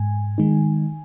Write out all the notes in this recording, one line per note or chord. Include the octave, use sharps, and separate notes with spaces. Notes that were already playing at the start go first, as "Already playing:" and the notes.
Already playing: G#2 G#5
D#3 G#3 D#4